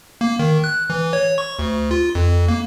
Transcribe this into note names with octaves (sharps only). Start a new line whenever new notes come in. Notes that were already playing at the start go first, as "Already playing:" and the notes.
A#3
D#3
F#6
E3
C#5
C#6
D2
F4
F2
A#3